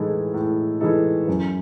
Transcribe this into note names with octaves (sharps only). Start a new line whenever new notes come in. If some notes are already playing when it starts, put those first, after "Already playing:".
Already playing: A2 E3 G#3 D#4 A4
A2
E3 G#3 D#4 A4
F#2